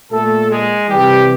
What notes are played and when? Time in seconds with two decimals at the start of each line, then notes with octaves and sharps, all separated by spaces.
0.11 A#2 A3 A4
0.50 G#3 G#4
0.89 C3 E3 G3 G4